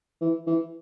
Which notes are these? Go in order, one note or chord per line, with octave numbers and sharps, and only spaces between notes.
E3
E3